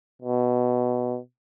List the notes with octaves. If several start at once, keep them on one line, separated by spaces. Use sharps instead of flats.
B2